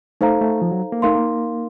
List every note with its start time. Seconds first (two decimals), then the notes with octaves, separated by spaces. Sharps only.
0.21 A3 D#4 A4 C5 F5 A#5
0.41 A3
0.62 F3
0.72 F#3
0.92 A#3
1.02 A3 D#4 A#4 F5 C6
1.16 A#3